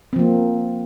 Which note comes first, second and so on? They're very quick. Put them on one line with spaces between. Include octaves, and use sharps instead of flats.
C4 F3 A#3